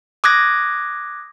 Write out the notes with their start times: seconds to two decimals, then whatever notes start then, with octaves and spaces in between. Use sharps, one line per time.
0.24 D6 D#6 F#6 G#6 A#6